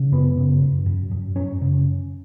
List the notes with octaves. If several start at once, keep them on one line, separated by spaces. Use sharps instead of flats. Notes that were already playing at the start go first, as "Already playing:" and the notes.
Already playing: C#3
F#2 B3
C#3
F#2
F#2
F#2
F#2 C#4
C#3